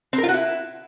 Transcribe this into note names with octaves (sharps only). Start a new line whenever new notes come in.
C4
A#4
F4
F#4
E4